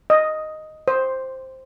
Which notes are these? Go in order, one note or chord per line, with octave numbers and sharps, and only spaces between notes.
D#5
C5